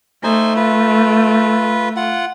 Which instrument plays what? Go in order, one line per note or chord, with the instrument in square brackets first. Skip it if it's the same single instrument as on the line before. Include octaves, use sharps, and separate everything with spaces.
[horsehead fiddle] A3 [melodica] D#4 C5 G#5
[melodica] F4 B4
F4 F#5